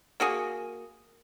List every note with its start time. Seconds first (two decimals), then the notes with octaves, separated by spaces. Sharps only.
0.20 A#3 F#4 G#4